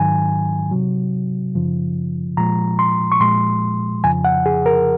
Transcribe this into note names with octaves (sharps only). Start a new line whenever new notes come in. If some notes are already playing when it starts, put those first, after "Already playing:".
Already playing: G#2 D#3 F#3 G#5
C3 F#3
F#2 C#3 F3
A#2 F3 G#3 A#5
C6
C#6
A#2 F3 G#3 C6
F2 C#3 F3 G#5
F#5
G#4
A#4